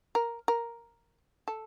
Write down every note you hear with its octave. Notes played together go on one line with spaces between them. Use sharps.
A#4
A#4
A4